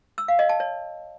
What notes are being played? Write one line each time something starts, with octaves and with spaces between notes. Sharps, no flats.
E6
F5
D#5
A5
C#5